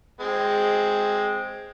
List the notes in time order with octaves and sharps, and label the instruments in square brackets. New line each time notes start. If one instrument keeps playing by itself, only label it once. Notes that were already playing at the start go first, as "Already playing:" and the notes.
[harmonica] G#3 C4